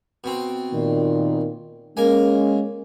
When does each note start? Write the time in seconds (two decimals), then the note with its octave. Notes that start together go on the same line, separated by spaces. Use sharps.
0.24 B2 C4
0.73 A#2 D#3
1.97 G#3 A#3 C#4 G#5